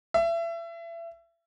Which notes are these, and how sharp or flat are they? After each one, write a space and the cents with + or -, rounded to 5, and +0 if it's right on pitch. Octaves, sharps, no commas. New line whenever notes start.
E5 +30